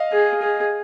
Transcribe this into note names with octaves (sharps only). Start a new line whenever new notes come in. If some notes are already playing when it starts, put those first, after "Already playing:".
Already playing: D#5 F5
G#4
G#4